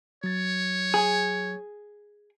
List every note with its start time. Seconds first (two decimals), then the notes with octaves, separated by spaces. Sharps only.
0.24 F#3 C#5 A6
0.94 G#4